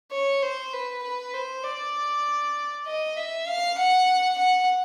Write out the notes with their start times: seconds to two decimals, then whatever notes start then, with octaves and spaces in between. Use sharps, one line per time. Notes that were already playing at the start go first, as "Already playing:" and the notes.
0.12 C#5
0.42 C5
0.73 B4
1.03 B4
1.33 C5
1.64 D5
2.87 D#5
3.17 E5
3.47 F5
3.78 F#5
4.38 F#5